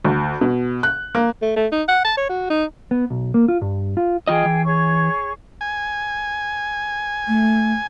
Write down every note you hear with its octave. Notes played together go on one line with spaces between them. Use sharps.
D2
B2
F#6
A#3
A3
A3
D#4
F#5
A5
C#5
F#4
D#4
B3
B1
A#3
F4
G2
F4
E3 F4 G#4 D#5 G5
E3
G#4 C#5 C#6
G#5
A3